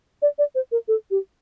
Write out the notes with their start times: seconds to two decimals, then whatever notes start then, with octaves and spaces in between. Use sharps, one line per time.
0.22 D5
0.38 D5
0.55 C5
0.72 A#4
0.88 A4
1.11 G4